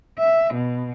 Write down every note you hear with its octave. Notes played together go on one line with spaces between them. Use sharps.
E5
B2